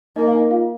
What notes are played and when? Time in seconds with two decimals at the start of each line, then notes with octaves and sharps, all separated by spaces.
0.16 A#3 D#4 D#5
0.27 F5
0.33 D#4 D#5
0.51 F4 F5